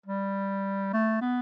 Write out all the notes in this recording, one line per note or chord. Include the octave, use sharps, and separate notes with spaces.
G3
A3
B3